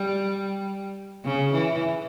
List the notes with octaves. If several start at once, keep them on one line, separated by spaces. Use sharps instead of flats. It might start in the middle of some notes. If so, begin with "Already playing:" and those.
Already playing: G3
C#3
E3